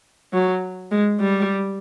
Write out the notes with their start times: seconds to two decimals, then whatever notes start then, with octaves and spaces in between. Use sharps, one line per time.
0.33 F#3
0.91 G#3
1.21 G3